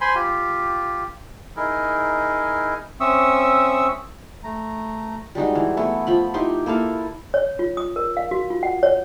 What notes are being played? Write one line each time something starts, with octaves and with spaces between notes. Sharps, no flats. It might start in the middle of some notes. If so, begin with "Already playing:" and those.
C5 G#5 B5 C6
F4 G4
D#4 E4 G#4 A#4
C4 C#4 E5 C#6 D#6 E6
A3 A#5
G3 G#3 D#4 F#4
E3
A3 B3 E4
F3 B5
D#4 E4 G4 C6
A#3 E4 A4 F5
C#5
F4
D#6
A#4
F5
F#4
F4
F#5
C#5